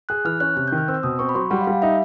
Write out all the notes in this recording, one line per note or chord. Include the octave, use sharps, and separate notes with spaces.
G#4 F#6
E3 F6
C#4 F#6
C3 F#6
G6
D#3
F6
C4 E6
B2 D#6
C4 C#6
B5
F#3 C6
G3 F#5
F5
G3
F5
D#4 E5